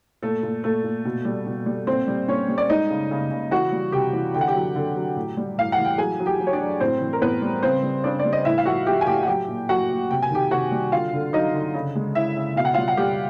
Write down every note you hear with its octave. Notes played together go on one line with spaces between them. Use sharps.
A#2 A3 A4
A#2
A#2 A3 A4
A#2
B2
G3
B2
G3
A#2 C4 C5
G3
A#2 C#4 C#5
G3
D5
G#3 D#4 D#5
C#3
C#3
C#3
E3 F#4 F#5
G3
C3 G4 G5
E3
D3 G5
F#5
G4 G5
F#3
D3
F#3
A2
G3
A2 F5
F#5
E3
G5
F#3 G#4 G#5
F#3
G4 G5
F#3
C#5
D4 D5
F#3
A2 C4 C5
E3
A#4
A2 B3 B4
G3
C#3 C4 C5
G3
C#3 D4 D5
D5
G3
D#5
A2 E4 E5
F5
F3 F#4 F#5
F3 G4 G5
G#5
A2 G4 G5
F#5
F#3 G4 G5
A#2
F#3 F#4 F#5
A#2
C3 G5
G#5
D#3 G4 G5
C3 F#4 F#5
G3
D3 F4 F5
D3
F#3 D#4 D#5
D3
C#3
G#3
C#3 E4 E5
C#3
B2 F5
F#5
G3 F4 F5
F#5
G3 G4 G5